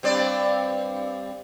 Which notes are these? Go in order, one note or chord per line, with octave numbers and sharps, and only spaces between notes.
G2 C4 D5